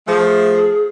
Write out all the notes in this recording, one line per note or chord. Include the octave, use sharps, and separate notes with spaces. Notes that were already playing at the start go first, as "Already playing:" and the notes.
F3 A3 G#4